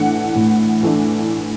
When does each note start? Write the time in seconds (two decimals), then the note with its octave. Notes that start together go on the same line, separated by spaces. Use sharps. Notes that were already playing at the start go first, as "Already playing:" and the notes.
Already playing: A2 E3 A3 D4 F#5
0.35 A2
0.83 E3 A3 D4